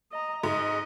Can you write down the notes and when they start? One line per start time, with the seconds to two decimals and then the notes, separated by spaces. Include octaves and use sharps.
0.12 D#5 A#5
0.44 G#2 D#5